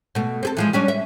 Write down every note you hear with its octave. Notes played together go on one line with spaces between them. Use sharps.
B2 A3
C4 G#4 A4
E3 F3 G#3
G3 C#4 D4
E5